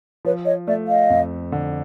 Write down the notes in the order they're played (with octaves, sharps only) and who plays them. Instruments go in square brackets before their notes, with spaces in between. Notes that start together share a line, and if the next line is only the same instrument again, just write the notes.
[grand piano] F3 [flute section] B4 C#5
[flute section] C#5 D#5
[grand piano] A3 [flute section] D5 E5
[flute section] D#5 F5
[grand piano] F2
D3